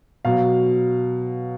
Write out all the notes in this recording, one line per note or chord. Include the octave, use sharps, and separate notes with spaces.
B2 F#3 F5